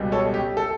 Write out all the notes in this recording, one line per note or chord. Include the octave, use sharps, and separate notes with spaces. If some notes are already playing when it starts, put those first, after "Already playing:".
Already playing: C#2 B2 G3
A4 C#5
G4
A4